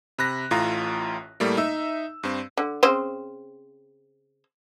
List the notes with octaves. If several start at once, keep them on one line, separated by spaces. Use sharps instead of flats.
C3 B5 F#6 A#6
A1 A2 F4 A#5
A2 G3 A3 A#3
D#4 E5 E6
G2 C4
D3
C#3 C4 C5